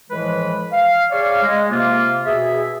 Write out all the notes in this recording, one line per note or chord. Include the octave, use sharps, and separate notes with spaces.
A2 E3 F3 G#3 B4
F5
G#4 C#5 D5 F5
G#3
C3 A#3 F4
B2 G#4 E5